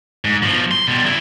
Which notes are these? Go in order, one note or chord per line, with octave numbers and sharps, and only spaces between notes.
G#2
B2 F3
C6
B2 G3
C#3 E4